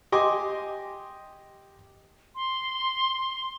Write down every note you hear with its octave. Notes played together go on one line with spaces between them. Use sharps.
G4 D#5 G#5 C6 D6
C6